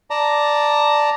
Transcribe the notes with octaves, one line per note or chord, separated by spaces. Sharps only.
D5 A5 A#5